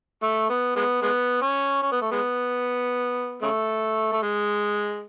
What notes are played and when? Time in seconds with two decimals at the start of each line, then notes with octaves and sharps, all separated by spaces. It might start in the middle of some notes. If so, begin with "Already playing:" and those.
0.23 A3
0.50 B3
0.76 G#3 B3
1.02 G#3 B3
1.42 C#4
1.83 C#4
1.92 B3
2.02 A3
2.12 G#3 B3
3.42 C#3 A3
4.12 A3
4.22 G#3